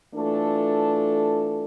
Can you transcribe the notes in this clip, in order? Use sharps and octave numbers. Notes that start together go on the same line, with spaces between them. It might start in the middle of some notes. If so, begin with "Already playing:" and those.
E3 A3 D4 F4 A4